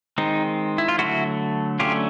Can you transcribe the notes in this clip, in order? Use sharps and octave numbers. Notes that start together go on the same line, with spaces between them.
D#3 G#3 C4 D#4
E4
F4
D3 F#3 A3 E4 F#4
D3 F#3 A3 C#4 F4 G4